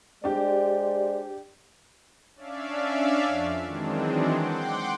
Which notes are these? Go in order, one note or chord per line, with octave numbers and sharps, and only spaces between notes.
G#3 D4 G4 C5 D5
C#4 D4 D5 E5 F5
F2 F3
D#3 E3 F#3 G#3 C4 D4
F#5 G5 C6 D6